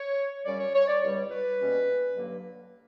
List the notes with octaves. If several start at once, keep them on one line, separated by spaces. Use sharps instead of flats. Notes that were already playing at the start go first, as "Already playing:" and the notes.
Already playing: C#5
F#2 C#3 G3 C#4 D5
C#5
C#5
D5
C#2 B2 G3
B4
B2 G3 A#3 C#4
G2 D3 F#3 A#3